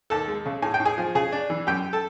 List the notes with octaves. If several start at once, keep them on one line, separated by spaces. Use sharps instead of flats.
D#2 A4 A5
G#3
C#3
A2 G#5
G5
A2
G#4 G#5
F3
C#3 G#4 G#5
D4
E3
F#2 G4 G5
A4 A5